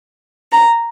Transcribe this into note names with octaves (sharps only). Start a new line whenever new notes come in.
A#5